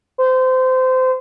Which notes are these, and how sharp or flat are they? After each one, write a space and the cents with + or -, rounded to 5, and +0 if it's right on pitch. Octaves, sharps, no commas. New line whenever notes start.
C5 -25